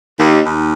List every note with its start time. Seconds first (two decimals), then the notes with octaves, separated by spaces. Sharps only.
0.18 D#2
0.44 D#2